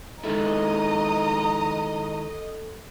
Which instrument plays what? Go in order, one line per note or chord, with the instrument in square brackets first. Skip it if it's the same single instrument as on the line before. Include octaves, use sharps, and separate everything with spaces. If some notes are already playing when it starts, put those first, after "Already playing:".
[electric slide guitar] D#3 G#3 E4 [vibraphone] A4 [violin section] D#5 [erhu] A#5